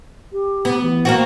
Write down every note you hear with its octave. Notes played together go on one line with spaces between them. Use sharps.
G4
B3
E3
A#3 C4 F#4